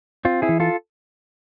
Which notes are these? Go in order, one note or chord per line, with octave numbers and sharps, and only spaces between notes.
C4 F4
E4 G#4
E3
F4 A4